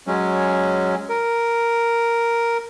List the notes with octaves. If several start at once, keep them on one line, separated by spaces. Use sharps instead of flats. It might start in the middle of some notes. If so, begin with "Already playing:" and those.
F#3 G#3 C#4
A#4